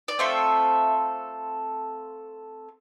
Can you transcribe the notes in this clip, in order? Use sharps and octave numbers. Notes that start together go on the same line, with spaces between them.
D5
A3 C4 F4 A4 E5